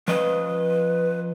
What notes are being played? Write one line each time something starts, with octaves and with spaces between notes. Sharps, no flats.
F3 B4 D#5